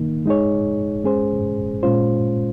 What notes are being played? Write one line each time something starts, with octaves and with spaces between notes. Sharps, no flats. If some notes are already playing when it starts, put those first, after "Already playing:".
Already playing: D#3 A#3 D#4
G#3 D#4 G#4 C#5
G#3 C#4 G#4 C5
A#2 G#3 C#4 F4 C5